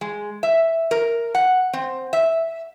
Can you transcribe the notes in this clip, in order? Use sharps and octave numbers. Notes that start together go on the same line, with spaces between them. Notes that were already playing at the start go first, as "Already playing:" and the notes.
G#3
E5
A#4
F#5
C4
E5